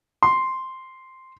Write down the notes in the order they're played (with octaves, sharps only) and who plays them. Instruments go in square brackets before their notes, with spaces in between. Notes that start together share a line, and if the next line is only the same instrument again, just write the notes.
[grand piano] C6